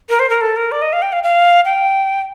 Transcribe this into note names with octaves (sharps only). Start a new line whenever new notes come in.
A#4
C5
A#4
A4
A#4
D5
D#5
F5
G5
F5
F5
G5